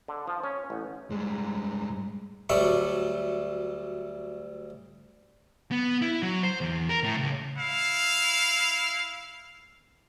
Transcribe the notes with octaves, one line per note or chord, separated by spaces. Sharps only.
D3
F3
C#4
A1
G2 G#3
D2 F#3 G3 E5 A5 C#6
B3
E4
F#3
C5
E2
A#4
A2
C#2
E4 F5